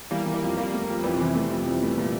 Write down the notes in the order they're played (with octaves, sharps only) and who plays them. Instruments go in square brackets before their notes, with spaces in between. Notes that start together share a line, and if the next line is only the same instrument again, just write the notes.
[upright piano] E3 [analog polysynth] G3 A#3
[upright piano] E3
[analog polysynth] G3 A#3
[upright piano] F2
[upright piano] F2 [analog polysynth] G3 A#3
[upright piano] A3
F2
[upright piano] F2 [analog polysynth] E3 G3
[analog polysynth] C3
[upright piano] E3
[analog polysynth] C3
[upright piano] A3
F2
F2
A3
A#2